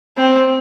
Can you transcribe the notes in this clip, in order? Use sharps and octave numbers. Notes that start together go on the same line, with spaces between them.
C4